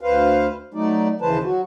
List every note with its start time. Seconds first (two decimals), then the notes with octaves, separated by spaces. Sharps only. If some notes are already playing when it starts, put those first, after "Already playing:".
0.01 D2 B4 C5 F5
0.74 F#3 A3 D#4 D5
1.22 D#2 C#3 E3 B4 C5 A5
1.44 F#3 F#4